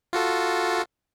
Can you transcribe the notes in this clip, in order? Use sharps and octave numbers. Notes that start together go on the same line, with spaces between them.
F4 F#4 A4